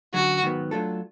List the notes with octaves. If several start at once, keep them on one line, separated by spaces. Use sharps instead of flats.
F#2 D3 F#3 F#4
G#2 D#3 F#3 B3
F#3 A3 D4 F4 A4